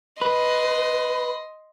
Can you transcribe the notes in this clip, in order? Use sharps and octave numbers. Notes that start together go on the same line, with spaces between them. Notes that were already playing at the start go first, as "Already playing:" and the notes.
B4 D#5 C6